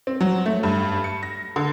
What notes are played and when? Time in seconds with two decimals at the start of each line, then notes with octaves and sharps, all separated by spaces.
0.07 C4
0.21 F#3
0.46 A3
0.63 G2
1.04 C#7
1.23 A#6
1.56 D3